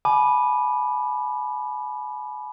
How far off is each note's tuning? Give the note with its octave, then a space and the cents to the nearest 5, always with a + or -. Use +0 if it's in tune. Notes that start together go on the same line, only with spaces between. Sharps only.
G#5 +40 B5 -10 D6 +20